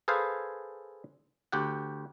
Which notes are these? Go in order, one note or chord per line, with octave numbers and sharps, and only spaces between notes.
G#4 A4 B4 C5 F5 G#5
D2 G4 F#5